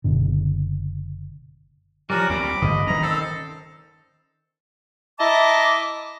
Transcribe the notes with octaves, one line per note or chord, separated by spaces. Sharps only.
F#1 B2 D3
F3 G3 C#4 F#4 A#4 D5
D2 G3 C4 A#5 B5 D6
D2 G2 D3 D#5
D#3 C#4 A#5
C4 A4 C5
E4 D#5 E5 A5 A#5 D6